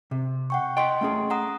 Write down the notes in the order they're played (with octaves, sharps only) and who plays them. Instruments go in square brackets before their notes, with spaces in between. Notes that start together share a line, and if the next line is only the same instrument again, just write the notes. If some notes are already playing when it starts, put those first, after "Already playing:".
[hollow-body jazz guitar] C3
[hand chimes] F#5 G5 C#6
[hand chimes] D#5 C6 [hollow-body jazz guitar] E5 F#5 G5
[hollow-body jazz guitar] A3 C#4 G#4
[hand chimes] F#5 A#5 D#6